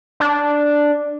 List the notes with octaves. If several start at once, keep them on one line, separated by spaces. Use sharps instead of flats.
D4